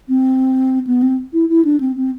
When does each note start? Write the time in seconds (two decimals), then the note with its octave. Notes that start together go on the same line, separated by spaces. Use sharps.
0.09 C4
0.87 B3
1.02 C4
1.33 E4
1.49 E4
1.65 D4
1.80 C4
1.96 C4